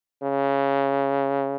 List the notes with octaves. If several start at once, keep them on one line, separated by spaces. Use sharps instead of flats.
C#3